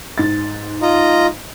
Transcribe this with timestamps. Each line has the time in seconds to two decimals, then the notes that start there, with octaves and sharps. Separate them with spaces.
0.18 G#2 A6
0.82 F4 D#5 A#5